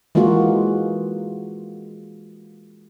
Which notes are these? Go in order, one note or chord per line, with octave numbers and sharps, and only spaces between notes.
E3 G#3 A#3 F4 F#4